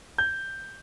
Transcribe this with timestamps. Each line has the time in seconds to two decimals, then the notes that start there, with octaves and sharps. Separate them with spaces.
0.18 G6